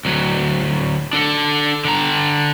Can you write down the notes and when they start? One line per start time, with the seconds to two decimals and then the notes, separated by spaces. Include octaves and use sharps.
0.05 D2 F#3
1.13 D4 A4
1.85 D3 A#5